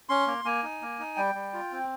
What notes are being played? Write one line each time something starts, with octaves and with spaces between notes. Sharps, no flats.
C#4 C6
A#3
A#3 G#5
D#4
A#3
D#4
G3 G5
G3
F4
C4